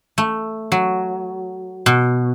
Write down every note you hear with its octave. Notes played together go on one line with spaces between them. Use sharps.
A3
F#3
B2